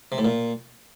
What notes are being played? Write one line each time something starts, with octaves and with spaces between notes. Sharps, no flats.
C3
A2
A#2